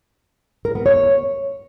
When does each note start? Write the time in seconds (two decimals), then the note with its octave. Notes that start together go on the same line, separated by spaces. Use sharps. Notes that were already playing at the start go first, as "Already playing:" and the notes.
0.65 A#4
0.75 B3
0.86 C#5